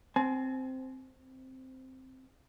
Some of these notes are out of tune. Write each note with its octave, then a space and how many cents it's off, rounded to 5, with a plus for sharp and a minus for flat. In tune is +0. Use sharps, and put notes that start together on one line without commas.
C4 -5 G#5 +40